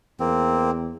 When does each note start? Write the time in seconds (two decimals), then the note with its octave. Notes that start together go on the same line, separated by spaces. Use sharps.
0.20 E2 A#3 C4